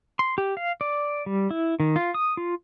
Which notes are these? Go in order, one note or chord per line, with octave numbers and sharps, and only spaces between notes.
C6
G4
F5
D5
G3
E4
D#3
F4
D#6
F4